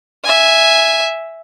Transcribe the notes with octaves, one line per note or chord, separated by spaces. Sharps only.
E5 G#5